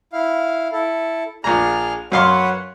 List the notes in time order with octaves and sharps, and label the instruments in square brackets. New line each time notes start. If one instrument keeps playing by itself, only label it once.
[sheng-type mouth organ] E4 F5
E4 A4
[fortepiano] A#1 A#5 [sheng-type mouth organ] D4 G#4 F6
[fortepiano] F#2 F5 C6 [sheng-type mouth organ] B4 C#5 F#5